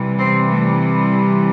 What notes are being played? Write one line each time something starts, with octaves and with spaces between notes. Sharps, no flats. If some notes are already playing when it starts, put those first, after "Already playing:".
Already playing: C3 E3 G3
C4
A3